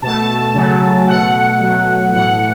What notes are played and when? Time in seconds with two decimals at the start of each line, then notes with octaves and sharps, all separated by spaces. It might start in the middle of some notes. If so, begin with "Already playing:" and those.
0.02 B2 A3 A5
0.54 C#3 F#3 A3
1.07 B2 A3 F#5
1.59 B2 F#3 A3
2.12 A2 E3 A3 F#5